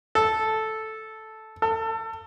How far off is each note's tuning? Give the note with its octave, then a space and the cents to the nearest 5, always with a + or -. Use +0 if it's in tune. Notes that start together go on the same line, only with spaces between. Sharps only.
A4 -5
A4 +30